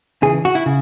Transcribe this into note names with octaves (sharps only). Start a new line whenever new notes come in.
C#3 E3 G#4
F#4
E4
C#3